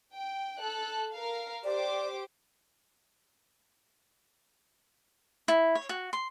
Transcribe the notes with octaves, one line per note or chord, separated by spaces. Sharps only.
G5
A4 F#6
A#4 F5
G4 C5 D5 D6
E4
C#5
F#4
C6